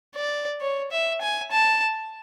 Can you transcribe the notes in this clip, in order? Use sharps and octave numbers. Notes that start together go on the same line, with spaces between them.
D5
C#5
E5
G#5
A5